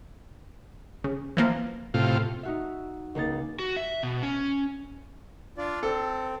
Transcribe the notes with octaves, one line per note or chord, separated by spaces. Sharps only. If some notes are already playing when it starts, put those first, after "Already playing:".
C#3
E3 F3 A#3
A2 C3 F4
D#4 F#4 E5
C#2 A#3 D#4 A6
F#4
E5
B2
C#4
D4 F4 D5
C4 A4